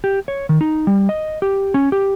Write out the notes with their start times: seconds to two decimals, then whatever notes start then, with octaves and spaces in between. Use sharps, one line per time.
0.04 G4
0.28 C#5
0.49 D#3
0.61 D#4
0.87 G3
1.09 D#5
1.42 G4
1.74 C#4
1.92 G4